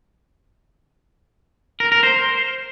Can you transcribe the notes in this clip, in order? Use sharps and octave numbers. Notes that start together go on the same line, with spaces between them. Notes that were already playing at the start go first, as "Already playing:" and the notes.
A#4
A#4
C5